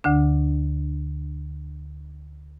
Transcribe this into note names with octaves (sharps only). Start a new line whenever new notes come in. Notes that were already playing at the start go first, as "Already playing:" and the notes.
D2 D3 D4